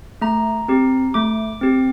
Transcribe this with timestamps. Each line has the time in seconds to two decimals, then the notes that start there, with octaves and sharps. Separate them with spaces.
0.22 A3 A#5
0.68 C4 G4
1.14 A3 D6
1.61 C4 G4